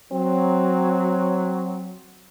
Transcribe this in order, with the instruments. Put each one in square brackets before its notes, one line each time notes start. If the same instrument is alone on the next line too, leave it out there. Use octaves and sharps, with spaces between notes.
[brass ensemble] F#3 [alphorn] C4